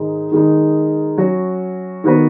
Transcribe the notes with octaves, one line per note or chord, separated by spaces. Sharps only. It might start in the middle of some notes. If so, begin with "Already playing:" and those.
Already playing: G#2 D#3 G#3 D#4 G#4
D#3 G#3 D#4
F#3 C#4 F#4 C#5
D#3 B3 F#4 B4